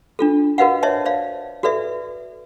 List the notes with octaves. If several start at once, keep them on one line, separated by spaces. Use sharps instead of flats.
D4 F4 A4
F#4 A#4 B4 D#5 F5 F#5
C5 C#5 D#5 E5 A5
C5 D5 F5
F#4 A4 B4 D5 E5